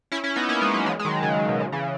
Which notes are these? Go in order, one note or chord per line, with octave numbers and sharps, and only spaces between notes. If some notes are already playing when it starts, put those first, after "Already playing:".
C#4 E4
C#4 E4
B3 D#4
A#3 C#4
G#3 B3
F#3 A#3
E3 G#3
G#3
D#3 F#3
C#3
C#3
B2
C#3
C#3 E3